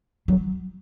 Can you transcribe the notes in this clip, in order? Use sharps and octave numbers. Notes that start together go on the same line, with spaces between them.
F#3